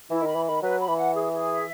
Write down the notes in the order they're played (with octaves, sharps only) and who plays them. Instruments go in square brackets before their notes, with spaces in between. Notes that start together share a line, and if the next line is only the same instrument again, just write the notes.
[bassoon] E3 [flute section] E4
[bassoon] D#3
[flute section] B5
[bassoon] E3
[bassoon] D#3 [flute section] B5
[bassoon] F#3 [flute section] B4
[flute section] B5
[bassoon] E3
[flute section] F#5
G#4
G#4
E5